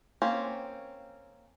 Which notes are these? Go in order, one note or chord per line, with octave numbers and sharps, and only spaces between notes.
A#3 C4 C#4